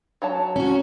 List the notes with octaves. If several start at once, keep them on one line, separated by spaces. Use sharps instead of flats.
F#3 C#5 A5
C#4 F#4